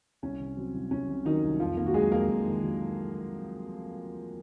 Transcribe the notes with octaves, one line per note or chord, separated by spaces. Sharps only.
C2 C#4
C3
F#3 C4
C2
C2 C#4
C3
D#3 F#3 D#4
C2
F2 F3 F4
D#3 A#3 A#4
F#4
F#3 G#3 G#4
F2 A#3 A#4
F2
D#3
F#3